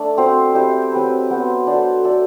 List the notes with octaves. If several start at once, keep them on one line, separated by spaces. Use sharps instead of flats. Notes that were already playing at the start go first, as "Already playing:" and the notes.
Already playing: A3 D4
C4 F#4 C5
E4 G4 C5 E5
F#3 C4 G4 B4
F#3 B3 F#4 C5
D4 F#4 A4 C5
D4 A4 E5